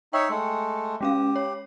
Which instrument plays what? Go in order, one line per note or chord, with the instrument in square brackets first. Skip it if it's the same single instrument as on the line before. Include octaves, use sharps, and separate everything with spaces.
[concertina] D#4 C#5 E5 [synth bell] G5 C#7
[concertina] G#3 A3
[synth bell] G#3 C#4 F5 [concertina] G4
[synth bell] C#5